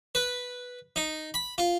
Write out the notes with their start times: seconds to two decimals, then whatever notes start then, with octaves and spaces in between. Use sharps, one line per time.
0.15 B4
0.96 D#4
1.34 B5
1.58 F4